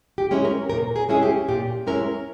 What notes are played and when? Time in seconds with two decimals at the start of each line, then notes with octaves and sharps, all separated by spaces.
0.18 G4
0.31 G#3 C#4 E4
0.45 A#4
0.70 A#2 A#4
0.96 G#4
1.09 G#3 C#4 E4 G#4
1.23 G4
1.48 A#2 G4
1.87 G#3 C#4 E4 A#4